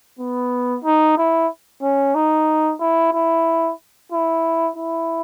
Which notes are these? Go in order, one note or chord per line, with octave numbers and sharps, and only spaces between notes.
B3
D#4
E4
C#4
D#4
E4
E4
E4
E4